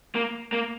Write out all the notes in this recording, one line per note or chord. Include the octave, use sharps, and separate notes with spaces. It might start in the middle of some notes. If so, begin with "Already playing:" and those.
A#3
A#3